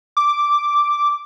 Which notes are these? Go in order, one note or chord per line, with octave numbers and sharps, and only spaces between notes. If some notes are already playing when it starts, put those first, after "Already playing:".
D6